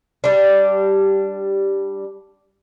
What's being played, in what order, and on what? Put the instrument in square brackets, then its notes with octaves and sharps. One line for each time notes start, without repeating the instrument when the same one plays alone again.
[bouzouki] G3 D4